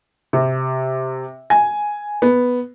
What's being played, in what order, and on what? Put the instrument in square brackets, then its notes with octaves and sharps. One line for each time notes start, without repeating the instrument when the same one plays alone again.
[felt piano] C3
G#5
B3